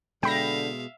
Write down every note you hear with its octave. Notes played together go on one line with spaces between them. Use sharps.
B2 D3 G#3 E5 F5 G5 B5 A#6